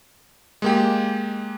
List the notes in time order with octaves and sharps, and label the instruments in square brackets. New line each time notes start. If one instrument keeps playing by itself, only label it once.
[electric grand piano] G#3 A#3 G4